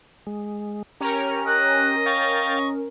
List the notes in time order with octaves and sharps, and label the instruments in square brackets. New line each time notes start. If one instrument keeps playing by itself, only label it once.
[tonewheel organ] G#3
[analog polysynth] C#4 A#4 [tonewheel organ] G4 [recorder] A#5
[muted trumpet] D#5 [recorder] F#6
[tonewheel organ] F5 G5 A6 [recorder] C#6